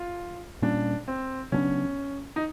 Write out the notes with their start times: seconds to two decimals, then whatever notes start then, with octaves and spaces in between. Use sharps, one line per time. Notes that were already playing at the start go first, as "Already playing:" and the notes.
Already playing: F4
0.62 A#2 G3 A#3 C#4 D4
1.08 C4
1.52 C#3 F#3 B3 C#4 D4
2.36 D#4